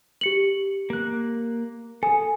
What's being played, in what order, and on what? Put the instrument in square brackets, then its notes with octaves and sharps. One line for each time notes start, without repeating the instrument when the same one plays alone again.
[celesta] G4 C#7 F#7
[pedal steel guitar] A#3 F#6
[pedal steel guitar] A4 D#6 [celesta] G#5